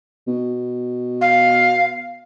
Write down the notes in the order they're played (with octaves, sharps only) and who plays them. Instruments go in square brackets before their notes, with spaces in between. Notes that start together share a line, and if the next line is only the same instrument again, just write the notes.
[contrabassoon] B2
[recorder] F5